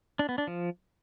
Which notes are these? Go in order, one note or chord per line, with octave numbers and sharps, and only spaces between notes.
D4
B3
D4
F3